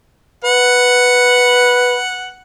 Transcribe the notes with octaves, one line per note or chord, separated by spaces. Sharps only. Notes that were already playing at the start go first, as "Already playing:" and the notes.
B4 F#5